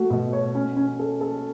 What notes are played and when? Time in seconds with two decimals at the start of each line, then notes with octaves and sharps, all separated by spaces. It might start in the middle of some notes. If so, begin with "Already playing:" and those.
Already playing: A3 F#4
0.10 B2
0.33 C#5
0.55 C#4
0.77 C#4
0.99 A4
1.21 A4